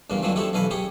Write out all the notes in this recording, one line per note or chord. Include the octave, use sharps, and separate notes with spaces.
E2 G2 C#3 A#3
D#3 F3 F#3 G#3 D4 E4
C4 D4 E4 G4 A4 C#5
B1 E3 A4 F5 G#5 B5
C#4 G4 G#4 C#5